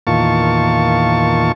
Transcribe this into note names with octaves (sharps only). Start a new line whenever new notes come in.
E2 A#2 D#3 F4 A5 C#6